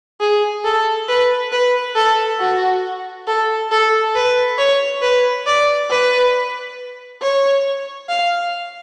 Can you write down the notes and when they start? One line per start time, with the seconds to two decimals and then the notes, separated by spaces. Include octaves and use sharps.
0.20 G#4
0.64 A4
1.08 B4
1.52 B4
1.95 A4
2.40 F#4
3.27 A4
3.71 A4
4.15 B4
4.58 C#5
5.02 B4
5.46 D5
5.90 B4
7.22 C#5
8.09 F5